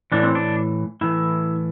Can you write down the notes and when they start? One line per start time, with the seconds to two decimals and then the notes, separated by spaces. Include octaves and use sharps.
0.12 A2 E3 D4
0.23 C4
0.35 D4
1.01 A2 E3 E4